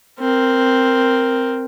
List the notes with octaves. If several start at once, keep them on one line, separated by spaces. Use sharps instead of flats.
C4 A#4